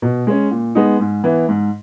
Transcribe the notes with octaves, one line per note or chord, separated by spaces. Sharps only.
B2
G#3 C#4
A#2
G#3 B3 D#4
G#2
E3 B3 E4
G#2